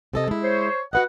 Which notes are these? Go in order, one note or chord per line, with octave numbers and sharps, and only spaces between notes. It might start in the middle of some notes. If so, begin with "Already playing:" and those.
C3 A4 D#5
G#3 E4
C5 C#5
F#4 B4 D#5 F#5